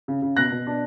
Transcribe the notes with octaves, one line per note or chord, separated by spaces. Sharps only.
C#3
C#3
B2 F#6 A#6
B2
D4